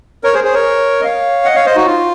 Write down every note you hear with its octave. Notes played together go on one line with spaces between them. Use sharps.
A#4 C#5
G#4 C5
G#4 C5
A#4 C#5
D#5
C#5 F5
D#5 F#5
C#5 F5
C5 D#5
D#4 F#4
F4